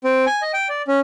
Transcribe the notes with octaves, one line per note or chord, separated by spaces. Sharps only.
C4
G#5
D#5
G5
D5
C#4